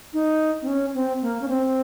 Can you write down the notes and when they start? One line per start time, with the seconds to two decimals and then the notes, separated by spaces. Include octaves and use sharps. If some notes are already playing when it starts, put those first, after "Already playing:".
0.13 D#4
0.62 C4
0.67 C#4
0.94 C4
1.22 A#3
1.42 C#4
1.48 C4